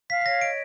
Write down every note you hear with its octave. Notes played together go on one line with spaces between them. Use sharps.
F5 B6
B6
C#5 A#6
D#5 D7